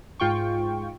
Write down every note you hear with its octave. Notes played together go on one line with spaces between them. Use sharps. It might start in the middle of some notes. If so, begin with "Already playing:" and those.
G#2 F4 G5 C#6